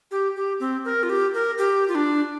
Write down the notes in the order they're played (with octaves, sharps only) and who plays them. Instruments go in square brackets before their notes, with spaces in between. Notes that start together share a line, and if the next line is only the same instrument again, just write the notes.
[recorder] G4
G4
C4
A#4
F4
G4
A#4
G4
F4
D4